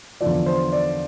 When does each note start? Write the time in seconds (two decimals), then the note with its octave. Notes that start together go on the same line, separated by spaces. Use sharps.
0.21 E2 D3 F3 D5
0.46 C5
0.72 D5